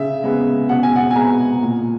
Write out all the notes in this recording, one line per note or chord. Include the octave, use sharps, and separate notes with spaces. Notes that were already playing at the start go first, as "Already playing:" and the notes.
Already playing: C#3 E5
G#3 B3
B2 F#5
G#5
F#5
G#5
G#3 B3 A#5
A#2